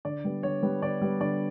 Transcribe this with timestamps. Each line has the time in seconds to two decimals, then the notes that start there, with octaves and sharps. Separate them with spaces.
0.05 D3 D5
0.24 G3 B3
0.43 D3 C#5
0.63 G3 B3
0.82 D3 D5
1.01 G3 B3
1.21 D3 D5